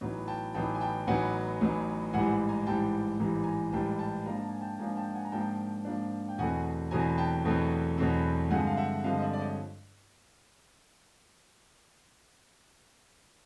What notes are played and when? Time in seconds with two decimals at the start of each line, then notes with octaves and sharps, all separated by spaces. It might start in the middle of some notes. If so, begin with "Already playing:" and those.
0.01 A1 A2 F#3 B3 D#4
0.28 G5 A5
0.54 A1 A2 F#3 B3 D#4 G5 A5
0.75 G#5
0.80 G5 A5
1.07 A1 A2 F#3 B3 D#4 F#5 G#5
1.61 A1 A2 F#3 B3 D#4
2.13 A1 G#2 E3 G3 F#5 G#5
2.49 G#5 A#5
2.67 A1 G#2 E3 G3 G5 A5
3.19 A1 G#2 E3 G3 A#5
3.44 G#5 A#5
3.73 A1 G#2 E3 G3 G5 A5
3.99 G5 A5
4.26 G#2 F3 A#3 D4 A#5
4.37 A5
4.49 G#5
4.61 G5 A5
4.79 G#2 F3 A#3 D4 G#5 A#5
4.97 G5 A5
5.14 F#5 G#5
5.25 A#5
5.32 G#2 F3 A#3 D4 G5 A5
5.85 G#2 F3 A#3 D4
6.29 G5
6.38 E2 B2 F#3 A3 C4 F#5 G#5
6.91 E2 B2 F#3 A3 C4 G#5 A#5
7.18 G5 A5
7.44 E2 B2 F#3 A3 C4
7.98 E2 B2 F#3 A3 C4
8.51 G2 D3 F3 G#3 C4 F#5 G#5
8.67 F5
8.77 E5 F#5
9.04 G2 D3 F3 G#3 C4 D#5 F5
9.18 D#5
9.22 D5 E5
9.33 D5
9.39 C#5 D#5